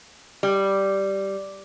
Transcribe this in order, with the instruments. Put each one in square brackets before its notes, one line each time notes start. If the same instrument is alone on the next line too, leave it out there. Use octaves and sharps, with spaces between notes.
[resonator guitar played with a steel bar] G3